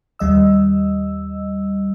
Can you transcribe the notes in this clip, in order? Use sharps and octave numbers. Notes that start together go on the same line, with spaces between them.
D#2 G3 D#5 E6